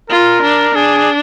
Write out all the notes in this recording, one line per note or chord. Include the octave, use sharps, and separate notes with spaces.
F4 A#4
D4
D4 G#4